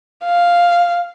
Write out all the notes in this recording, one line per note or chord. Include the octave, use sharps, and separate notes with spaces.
F5